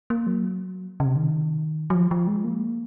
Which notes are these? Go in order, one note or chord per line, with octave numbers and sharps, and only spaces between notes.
A#3
F#3
C#3
C3
D#3
F#3
F3
F3
G#3
A#3